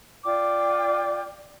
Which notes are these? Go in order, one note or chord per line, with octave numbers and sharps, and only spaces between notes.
F4 D5 G5 D6